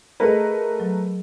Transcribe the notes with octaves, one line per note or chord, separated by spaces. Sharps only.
A3 G#4 A#4 B4 D#5
F#3